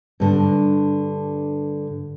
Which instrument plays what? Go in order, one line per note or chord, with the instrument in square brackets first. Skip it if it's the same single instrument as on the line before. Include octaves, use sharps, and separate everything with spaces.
[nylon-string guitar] G2 D3